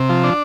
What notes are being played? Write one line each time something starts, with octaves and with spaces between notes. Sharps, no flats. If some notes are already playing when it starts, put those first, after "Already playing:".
Already playing: C3
F3
D4